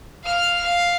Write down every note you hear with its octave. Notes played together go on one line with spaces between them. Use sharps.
F5 F6
F5